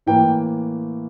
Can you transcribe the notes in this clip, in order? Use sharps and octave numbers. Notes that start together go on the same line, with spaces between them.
A2 E3 A#3 G5